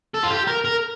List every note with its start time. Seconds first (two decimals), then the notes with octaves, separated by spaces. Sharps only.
0.14 A4
0.23 F4
0.31 G4
0.47 A#4
0.65 A#4